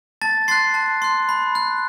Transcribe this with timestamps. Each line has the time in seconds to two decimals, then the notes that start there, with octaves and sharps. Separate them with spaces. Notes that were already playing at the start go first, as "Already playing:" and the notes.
0.21 A5 A6
0.48 C6 F#6 A6 C7
0.74 A5
1.02 C6 F#6
1.29 B5
1.55 F#6